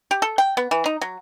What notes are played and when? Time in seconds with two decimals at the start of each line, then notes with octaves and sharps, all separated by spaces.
0.11 G4
0.22 A4
0.38 G5
0.57 B3
0.71 E3
0.86 D#4
1.01 F#3